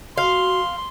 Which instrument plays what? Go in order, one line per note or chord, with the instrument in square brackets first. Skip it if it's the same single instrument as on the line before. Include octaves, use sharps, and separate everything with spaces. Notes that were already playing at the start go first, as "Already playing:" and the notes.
[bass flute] F#4 [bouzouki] F5 [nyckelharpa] C6